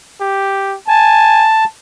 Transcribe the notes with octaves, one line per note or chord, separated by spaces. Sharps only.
G4
G#5 A5